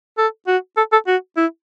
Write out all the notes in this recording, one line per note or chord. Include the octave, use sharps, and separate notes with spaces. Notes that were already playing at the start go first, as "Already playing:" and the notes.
A4
F#4
A4
A4
F#4
E4